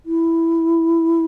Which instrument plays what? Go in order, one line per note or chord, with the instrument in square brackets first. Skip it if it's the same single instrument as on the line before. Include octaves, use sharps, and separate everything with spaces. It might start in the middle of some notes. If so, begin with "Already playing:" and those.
[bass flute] E4